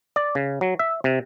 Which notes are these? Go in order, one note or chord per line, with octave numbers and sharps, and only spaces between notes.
D5
C#3
F#3
E5
C3